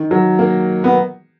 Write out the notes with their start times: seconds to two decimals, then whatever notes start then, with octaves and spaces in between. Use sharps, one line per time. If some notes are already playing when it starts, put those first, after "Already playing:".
Already playing: D#3
0.11 F#3
0.39 A#3
0.84 B3